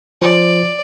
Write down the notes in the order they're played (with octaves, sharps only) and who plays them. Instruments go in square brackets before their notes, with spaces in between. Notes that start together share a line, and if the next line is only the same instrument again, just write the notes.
[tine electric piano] F3 [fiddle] D5